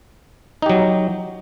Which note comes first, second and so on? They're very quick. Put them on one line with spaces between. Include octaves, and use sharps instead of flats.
D#4 G4 F#3